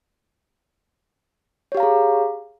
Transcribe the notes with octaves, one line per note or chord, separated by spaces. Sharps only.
G4 G#4 C#5 F5 A#5